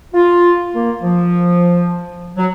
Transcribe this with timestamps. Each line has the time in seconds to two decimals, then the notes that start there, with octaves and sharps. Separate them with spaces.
0.14 F4
0.75 A#3
1.02 F3
2.37 F#3